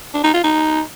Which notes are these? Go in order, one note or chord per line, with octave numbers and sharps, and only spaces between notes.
D4
D#4
F4
D#4